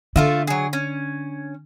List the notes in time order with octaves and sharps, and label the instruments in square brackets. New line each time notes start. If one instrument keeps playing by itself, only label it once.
[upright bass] D3 [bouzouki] A3 F4 E5
[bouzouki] F#3 G#4
C#4